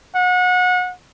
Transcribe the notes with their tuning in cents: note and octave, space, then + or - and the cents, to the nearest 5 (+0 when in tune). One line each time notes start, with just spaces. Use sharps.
F#5 -30